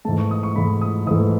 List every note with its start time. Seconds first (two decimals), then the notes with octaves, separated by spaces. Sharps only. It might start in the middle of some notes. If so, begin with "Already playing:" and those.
0.05 G#2 E3 A3 A5
0.18 C#6
0.31 D#6
0.43 C#6
0.56 G#2 E3 A3 B5
0.81 D#6
1.07 G#2 E3 A3 D#6